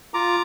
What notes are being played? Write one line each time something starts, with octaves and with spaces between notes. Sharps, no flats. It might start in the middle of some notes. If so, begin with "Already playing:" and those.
F4 A#5 D6